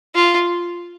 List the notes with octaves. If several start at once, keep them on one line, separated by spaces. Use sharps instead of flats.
F4